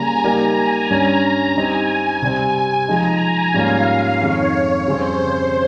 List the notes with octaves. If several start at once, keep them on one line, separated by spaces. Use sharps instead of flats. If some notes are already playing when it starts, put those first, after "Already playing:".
Already playing: C#3 G3 A#3 G#5 A#5
G3 A#3 D#4 G4 A#4 A#5
G#5
G2 G3 C#4 A#5
G3 C4 D#4 G4 G#5
C3 G3 C4
G#5
F3 G#3 D#4 A#5
G#5
G#2 G3 A#3 C#4 F4 F5
F2 D#3 G#3 C#5
F2 C#3 G3 C4 C5
C5